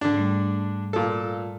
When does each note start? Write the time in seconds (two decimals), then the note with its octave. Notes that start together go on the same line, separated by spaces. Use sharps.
0.01 G#2 D3 D4
0.15 G#2 G3 A3
0.93 A#2 A4